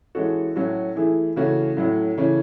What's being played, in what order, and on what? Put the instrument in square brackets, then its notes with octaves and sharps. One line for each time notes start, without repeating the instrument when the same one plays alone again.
[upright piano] E3 G#3 C#4 F#4 A4
A2 F#3 C#4 F#4 A4
E3 A3 E4 G#4
C#3 E3 A3 C#4 F#4
A2 F#3 A3 C#4
C#3 E3 A3 C#4